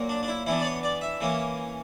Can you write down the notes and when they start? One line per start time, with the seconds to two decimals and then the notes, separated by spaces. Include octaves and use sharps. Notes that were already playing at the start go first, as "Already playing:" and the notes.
Already playing: A#2 F#3 A#3
0.09 D4
0.23 D4
0.28 E4
0.46 E3 B3 D4 E4
0.60 D5
0.65 C#5
0.83 D5
1.01 E5
1.21 E3 A#3 C#4